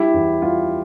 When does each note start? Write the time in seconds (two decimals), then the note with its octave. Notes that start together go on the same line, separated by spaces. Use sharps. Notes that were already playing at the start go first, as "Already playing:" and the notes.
Already playing: G3 E4 G4
0.14 E2
0.42 G3 F4